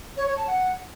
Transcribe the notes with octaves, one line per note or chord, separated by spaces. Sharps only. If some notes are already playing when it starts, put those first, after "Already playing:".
C#5
C#5
A5
F#5